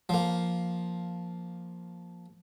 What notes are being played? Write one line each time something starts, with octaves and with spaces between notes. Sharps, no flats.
F3 A#3